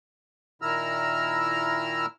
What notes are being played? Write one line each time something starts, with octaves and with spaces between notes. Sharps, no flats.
A#2 D#3 E4 A#5 E6 F6